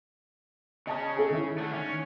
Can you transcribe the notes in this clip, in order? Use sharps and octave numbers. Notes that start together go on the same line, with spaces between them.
C#3 C#4 D#5 A5 D#6
G#4 A4
D#3 E4
D3 A3
D#3 C#4